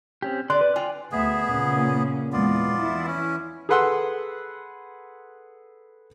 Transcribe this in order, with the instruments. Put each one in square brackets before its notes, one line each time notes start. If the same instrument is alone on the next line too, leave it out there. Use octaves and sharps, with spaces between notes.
[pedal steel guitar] C4 C#4 G4
[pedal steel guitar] D3 C6 F#6 [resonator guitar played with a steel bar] D5
[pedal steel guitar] B4
[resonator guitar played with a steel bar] F4 [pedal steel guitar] D5 G5 G#5
[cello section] D2 E5 [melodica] B3 G#4
[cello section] A#2 C#3 C#4
[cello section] E2 A#2 G#3 [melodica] B3 F4 D5
[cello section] E3 E4
[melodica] C#4
[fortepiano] G#4 A4 B4 F#5 C6 E6